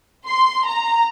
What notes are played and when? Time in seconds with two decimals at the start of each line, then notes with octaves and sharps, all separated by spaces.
0.27 C6
0.66 A#5